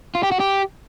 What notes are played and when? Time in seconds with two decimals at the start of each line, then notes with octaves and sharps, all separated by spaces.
0.15 F4
0.23 G4
0.32 F#4
0.40 G4